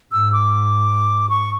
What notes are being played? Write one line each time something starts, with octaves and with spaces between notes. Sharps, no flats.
G#2 E6
D6
C#6